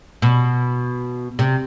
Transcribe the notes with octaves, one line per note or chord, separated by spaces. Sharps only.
B2
C3